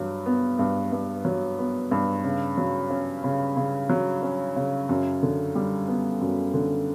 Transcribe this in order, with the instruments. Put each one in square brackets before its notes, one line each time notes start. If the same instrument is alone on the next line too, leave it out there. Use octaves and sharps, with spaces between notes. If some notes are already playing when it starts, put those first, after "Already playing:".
Already playing: [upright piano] G2 F#3
B3
G2
G2
F#3
B3
G2
C#3
F#3
C#4
C#3
C#3
F#3
C#4
C#3
F#2
D3
G3
B3
F#2
D3